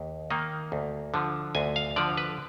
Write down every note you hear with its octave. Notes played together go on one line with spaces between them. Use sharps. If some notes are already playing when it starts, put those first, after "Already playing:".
Already playing: D#2
D#3 A#3 D#4
D2
D3 F3
D2 G#5
F5
D3 F3 D5
B4